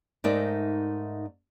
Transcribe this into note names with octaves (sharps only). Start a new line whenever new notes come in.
G#2 A3 D#4 A#4 D5 E5